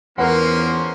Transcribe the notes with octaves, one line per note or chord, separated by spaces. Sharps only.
E2 F3 A#3 C#4 A#4 B4 F#5 C6